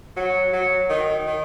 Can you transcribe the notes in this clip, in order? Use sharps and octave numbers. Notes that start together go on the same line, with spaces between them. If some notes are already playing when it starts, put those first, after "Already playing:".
F#3
F#3
D#3
D#3